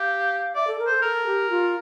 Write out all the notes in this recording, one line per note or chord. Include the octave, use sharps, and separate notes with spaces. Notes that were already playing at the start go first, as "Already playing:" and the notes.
Already playing: G4 F5
D5 E5
A4
A#4
A4 C5
A4 A#4
G4
F4